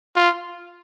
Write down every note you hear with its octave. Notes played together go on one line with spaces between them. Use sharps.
F4